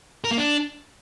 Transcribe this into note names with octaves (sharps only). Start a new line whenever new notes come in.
A#4
A#3
D4